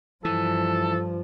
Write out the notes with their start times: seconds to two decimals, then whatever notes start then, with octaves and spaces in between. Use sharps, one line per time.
0.25 G2 E3 F3 A4